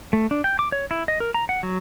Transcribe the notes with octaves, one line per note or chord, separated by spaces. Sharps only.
A3
D4
G5
D6
C#5
E4
D#5
A#4
A#5
F#5
F#3